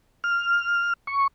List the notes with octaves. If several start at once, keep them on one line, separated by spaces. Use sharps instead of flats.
F6
C#6